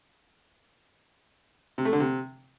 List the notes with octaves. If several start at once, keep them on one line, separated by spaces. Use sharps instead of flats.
C3
A3
D3
C3